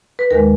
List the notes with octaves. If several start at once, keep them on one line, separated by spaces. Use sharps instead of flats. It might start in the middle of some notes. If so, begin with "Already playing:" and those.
B4
D#2 D#3 G#3 A#4